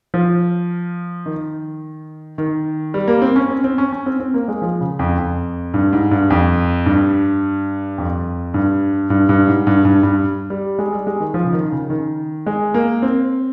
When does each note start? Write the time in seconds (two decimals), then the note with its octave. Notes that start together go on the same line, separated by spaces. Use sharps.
0.14 F3
1.26 D#3
2.38 D#3
2.94 G3
3.08 A#3
3.22 C4
3.36 C#4
3.50 C4
3.64 C4
3.78 C#4
3.92 C#4
4.06 C4
4.20 C4
4.34 A#3
4.48 G#3
4.62 F3
4.81 C#3
4.99 F2
5.18 F2
5.74 G2
5.93 G#2
6.11 G2
6.30 F2
6.86 G2
7.98 F2
8.54 G2
9.10 G2
9.29 G2
9.47 G#2
9.67 G2
9.85 G2
10.03 G2
10.50 G3
10.79 G#3
10.92 G3
11.07 G#3
11.20 D#3
11.34 F3
11.45 C#3
11.53 D#3
11.72 C#3
11.90 D#3
12.46 G#3
12.74 A#3
13.02 C4